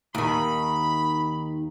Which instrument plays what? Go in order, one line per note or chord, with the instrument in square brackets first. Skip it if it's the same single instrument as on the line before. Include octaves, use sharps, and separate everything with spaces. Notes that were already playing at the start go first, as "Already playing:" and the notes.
[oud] D#2 D#3 [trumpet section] B5